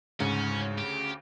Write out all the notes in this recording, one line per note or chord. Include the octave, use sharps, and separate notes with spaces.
D2 G#2 C#3 C#4
G4